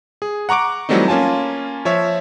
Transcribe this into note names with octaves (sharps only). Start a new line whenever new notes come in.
G#4
F#5 A#5 C#6 D6 D7
E3 F#3 G3 A3 C4 D#4
A#3 C#4 F4 G#5 A5
F3 C#5 E5